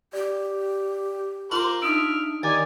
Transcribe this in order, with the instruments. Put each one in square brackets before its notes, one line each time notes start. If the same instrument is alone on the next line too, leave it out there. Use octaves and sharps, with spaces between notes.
[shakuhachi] G4 [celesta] D5
[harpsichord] F4 C6 [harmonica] A#4 C5 D6 [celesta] F#7
[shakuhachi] D4 [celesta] D#4 D#6 D7 [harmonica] E5 F6
[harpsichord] D#2 [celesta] D5 D6 A6 [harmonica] G#5